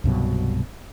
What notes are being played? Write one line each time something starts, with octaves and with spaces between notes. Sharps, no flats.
C2 G2 B2 F#3